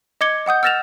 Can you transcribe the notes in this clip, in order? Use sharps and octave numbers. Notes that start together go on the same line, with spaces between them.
D#5 D6 G#6 C#7 G7
D#5 F#5 D#6 G6
E6 F6 A6 A#6 E7 F7